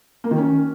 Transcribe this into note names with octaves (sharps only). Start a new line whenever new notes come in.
A#3
D#3
C#4